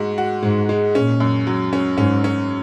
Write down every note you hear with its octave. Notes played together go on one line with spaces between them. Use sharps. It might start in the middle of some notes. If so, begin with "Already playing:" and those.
Already playing: G#2 G#3 F#4
F#4
G#2 G#3
G#3
A#2 C#4
F#2
F#3
C#4
G#2 C#4
C#4